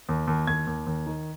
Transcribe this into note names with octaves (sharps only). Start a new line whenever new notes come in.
D#2
D#2
D#2 G#6
D#2
D#2
D#3